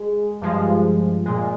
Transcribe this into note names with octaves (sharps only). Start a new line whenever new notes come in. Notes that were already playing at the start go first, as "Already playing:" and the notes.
Already playing: G#3
G2 F3 G#3
A#2 G#3